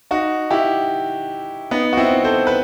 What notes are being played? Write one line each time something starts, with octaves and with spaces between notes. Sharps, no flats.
D#4 F#4
E4 G4
B3 D#4
F#4
C4 E4
A4 C5
B4